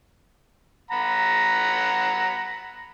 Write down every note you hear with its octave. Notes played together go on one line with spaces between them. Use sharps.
F#5 A#5 B5